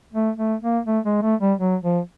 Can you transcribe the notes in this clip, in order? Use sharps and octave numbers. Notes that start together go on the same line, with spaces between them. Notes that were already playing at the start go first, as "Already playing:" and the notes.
A3
A3
A#3
A3
G#3
A3
G3
F#3
F3